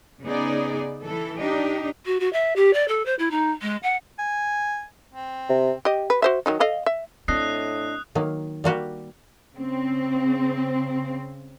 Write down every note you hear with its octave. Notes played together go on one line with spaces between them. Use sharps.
C#3 B3 D#4 G#4 D5
E3 A4
D4 D#4 G4
F#4
F#4
E5
G4
D5
A4
C5
E4
D#4
G#3
F#5
G#5
C4
C3
G4 D#5
B4
F#4 C5 E5
D#3 F#3 D#4
A4 D#5 F5
E5
A2 C4 D4 D#5 D#6 F#6 C7
D#3 F#3 A#3
G3 A#3 F#4 G4
C#3 C4